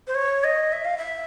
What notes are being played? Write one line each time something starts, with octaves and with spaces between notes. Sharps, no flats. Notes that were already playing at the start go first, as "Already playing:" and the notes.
C5
C#5
D#5
E5
F5
E5